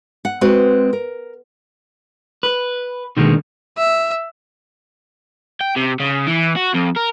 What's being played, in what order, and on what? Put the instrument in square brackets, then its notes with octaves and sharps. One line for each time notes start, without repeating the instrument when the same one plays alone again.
[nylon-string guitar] F#5
G#3 C4 F#4 B4
A#4
[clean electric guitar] B4
B2 D3 D#3 G#3 A#3 B3
[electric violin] E5
[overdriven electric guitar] G5
C3
C#3
E3
F#4
F2
A#4